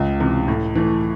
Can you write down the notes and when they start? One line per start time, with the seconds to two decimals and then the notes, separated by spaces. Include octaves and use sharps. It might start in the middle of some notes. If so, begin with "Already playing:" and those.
Already playing: C#2
0.20 C3 E3
0.48 A2
0.75 E3 A3